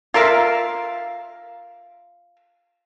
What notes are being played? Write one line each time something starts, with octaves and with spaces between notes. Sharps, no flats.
F4 A#4 E5 F5